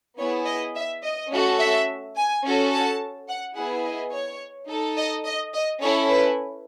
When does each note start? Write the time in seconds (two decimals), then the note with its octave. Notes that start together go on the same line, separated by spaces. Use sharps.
0.19 B3 E4 G#4 C#5
0.47 D#5
0.75 E5
1.04 D#5
1.32 A3 C#4 F#4 A4
1.59 E5
2.16 G#5
2.44 C#4 F#4 A4
2.71 A5
3.28 F#5
3.56 B3 E4 G#4 F#5
3.85 D#5
4.12 C#5
4.69 D#4 A4
4.97 D#5
5.25 D#5
5.53 D#5
5.81 C#4 E4 A4 C#5
6.09 B4